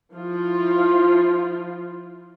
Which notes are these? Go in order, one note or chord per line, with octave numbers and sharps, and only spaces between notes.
F3 E4 F4